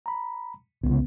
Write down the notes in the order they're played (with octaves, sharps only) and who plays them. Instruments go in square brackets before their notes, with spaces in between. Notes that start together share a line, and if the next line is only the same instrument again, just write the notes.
[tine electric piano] A#5 B5
[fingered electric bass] C2 C#3 [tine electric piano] B3